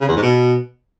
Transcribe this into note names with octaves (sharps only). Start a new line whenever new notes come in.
C#3
E2
G#2
B2